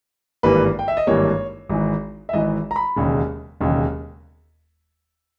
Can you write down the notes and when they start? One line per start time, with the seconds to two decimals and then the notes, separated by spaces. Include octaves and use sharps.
0.43 G#1 G2 E3 G3 A#3 B4
0.79 G5
0.88 E5
0.97 D#5
1.07 G#1 G2 E3 G3 A#3 C#5
1.69 G#1 G#2 E3
2.29 E5
2.33 G#1 G#2 E3 D#5
2.71 A#5
2.76 B5
2.96 E1 D#2 C#3
3.61 E1 D#2 C#3